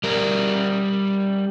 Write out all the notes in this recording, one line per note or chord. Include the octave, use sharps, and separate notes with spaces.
G3 A#4